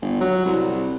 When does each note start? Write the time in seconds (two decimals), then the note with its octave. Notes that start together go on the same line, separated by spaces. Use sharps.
0.02 G1
0.21 F#3
0.46 C2